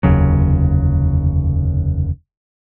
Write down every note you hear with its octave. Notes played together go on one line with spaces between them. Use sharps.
F1 D#2 C#3 F#3